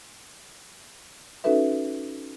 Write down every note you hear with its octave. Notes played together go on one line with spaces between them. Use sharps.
C#4 D#4 F#4 A4 B4 E5